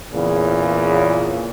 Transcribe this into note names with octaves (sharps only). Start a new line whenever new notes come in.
E2 A#2 C#3